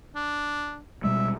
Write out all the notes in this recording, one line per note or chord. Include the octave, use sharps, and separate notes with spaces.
D4
B2 G3 G#3 E5